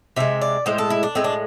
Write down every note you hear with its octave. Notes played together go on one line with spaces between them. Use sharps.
C3 G#3 E5
D5
A2 G#3 C5
A4
E4
D4
A2 G#3 C4
D4